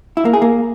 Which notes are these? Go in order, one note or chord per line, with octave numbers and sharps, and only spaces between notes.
E4
A#3
G#4
A#3